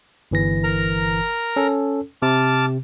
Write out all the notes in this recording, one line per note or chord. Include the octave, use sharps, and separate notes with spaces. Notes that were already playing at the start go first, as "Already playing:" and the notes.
G1 E3 A#6
A#4 A#5
C#4 A4
C3 A5 D6 F6